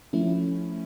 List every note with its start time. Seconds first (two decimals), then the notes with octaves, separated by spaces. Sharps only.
0.13 F3 A3 C#4 E4